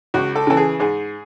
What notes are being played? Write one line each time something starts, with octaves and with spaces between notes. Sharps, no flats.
C#2 F#4
A4
C#3 E3 A4
G#4
G#2 G#4